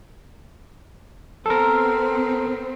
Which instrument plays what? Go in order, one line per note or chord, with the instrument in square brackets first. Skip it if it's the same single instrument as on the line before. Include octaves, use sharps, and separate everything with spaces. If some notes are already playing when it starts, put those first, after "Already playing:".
[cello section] B3 C4 [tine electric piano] A4 A#4